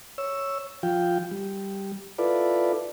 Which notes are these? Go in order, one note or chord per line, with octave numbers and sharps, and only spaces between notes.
C#5 E6
F3 F4 G5
G3
E4 F4 A4 B4 D5